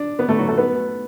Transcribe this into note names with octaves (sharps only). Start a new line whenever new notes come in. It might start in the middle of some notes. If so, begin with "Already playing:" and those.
Already playing: D4
B3 B4
A3 A4
F#3 F#4
A3 A4
B3 B4